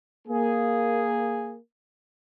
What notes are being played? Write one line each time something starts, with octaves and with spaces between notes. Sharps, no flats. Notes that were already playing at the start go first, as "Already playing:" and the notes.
A#3 G#4